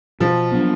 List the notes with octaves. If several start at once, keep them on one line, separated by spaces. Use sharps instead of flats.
B2 F3
F#3 B3 D4